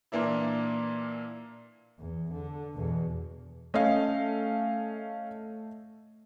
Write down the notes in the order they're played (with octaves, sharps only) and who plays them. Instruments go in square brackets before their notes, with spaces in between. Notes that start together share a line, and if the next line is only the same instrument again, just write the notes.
[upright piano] A#2 E3 A#3 D4 E4
[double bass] E2
D3
E2 B2
[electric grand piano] A3 D#5 [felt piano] C#4 F5